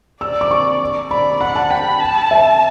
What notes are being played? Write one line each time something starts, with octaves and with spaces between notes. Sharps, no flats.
D5 E6
D6
C#6
D5 B5
F#5 B5
A5
G5 B5
A5
E5